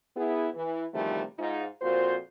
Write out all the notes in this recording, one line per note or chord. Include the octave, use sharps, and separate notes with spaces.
B3 E4 G#4
E3
E2 C3 D#3 F3 G3 A3
G#2 D#4 F4
F2 A#2 F4 F#4 C5